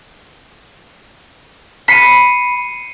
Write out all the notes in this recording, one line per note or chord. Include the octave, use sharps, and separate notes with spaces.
B5 C7 C#7 D#7